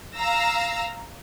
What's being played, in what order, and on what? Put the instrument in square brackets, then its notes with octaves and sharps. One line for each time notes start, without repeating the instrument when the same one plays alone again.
[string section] F5 A#5 E6 A#6